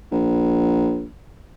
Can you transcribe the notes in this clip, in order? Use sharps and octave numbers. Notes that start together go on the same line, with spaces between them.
A#1